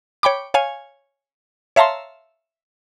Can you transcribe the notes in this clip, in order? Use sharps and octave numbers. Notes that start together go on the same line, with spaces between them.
C#5 G5 B5 D6
C#5 F5 G#5
C#5 E5 F5 A5 A#5 C6